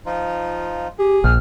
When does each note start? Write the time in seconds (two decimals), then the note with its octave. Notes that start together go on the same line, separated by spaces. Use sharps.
0.06 F3 D#4 F4
0.99 G4 G#4
1.24 A#1 F6